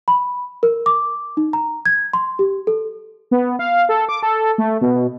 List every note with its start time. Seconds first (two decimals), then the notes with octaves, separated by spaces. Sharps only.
0.08 B5
0.63 A#4
0.86 D6
1.37 D#4
1.53 A#5
1.86 G#6
2.13 C6
2.39 G4
2.67 A4
3.31 B3
3.59 F5
3.89 A4
4.09 D6
4.23 A4
4.58 A3
4.81 B2